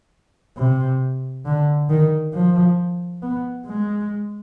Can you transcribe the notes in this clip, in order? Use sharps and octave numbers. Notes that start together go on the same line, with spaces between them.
C3
D3
D#3
F3
B3
G#3